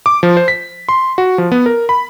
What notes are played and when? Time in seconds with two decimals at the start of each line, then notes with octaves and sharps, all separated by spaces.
0.06 D6
0.23 F3
0.37 C5
0.48 B6
0.89 C6
1.18 F#4
1.38 F3
1.52 B3
1.66 A#4
1.89 B5